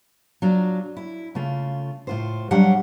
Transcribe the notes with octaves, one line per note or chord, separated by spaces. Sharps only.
F#3 D4 F4
E4
C#3 A3 F4
A2 F4 C5
F#3 G3 D4 C#5 F5 F#5